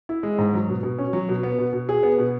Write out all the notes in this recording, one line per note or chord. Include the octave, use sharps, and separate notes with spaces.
E4
G#3
G#2
F#3
B2
B2
C#4
F#3
B2
B3
B2
B2
G#4
B3
B2